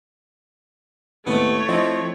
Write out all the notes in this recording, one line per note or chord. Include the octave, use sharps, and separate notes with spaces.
D#2 A2 C3 A3 B3 C#5
F3 C4 E4 D#5